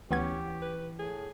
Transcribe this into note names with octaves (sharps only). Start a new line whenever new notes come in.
D2 E3 B3 C#4 G4 G#6
B4
A2 G#4